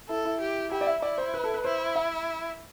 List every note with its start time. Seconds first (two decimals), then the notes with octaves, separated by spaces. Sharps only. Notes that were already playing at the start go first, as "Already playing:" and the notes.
0.09 E4 A4
0.25 E4
0.41 G4
0.72 E4 G4
0.81 D5
0.87 E5
1.02 E4 D5
1.18 C5
1.34 B4
1.44 A4
1.54 B4
1.64 E4 C5
1.95 E5